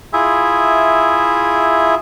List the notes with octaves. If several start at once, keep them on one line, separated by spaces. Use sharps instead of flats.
E4 F4 G#4 E5